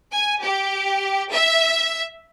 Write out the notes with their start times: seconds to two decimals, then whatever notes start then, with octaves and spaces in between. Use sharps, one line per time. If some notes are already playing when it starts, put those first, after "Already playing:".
0.12 G#5
0.42 G4
1.32 E5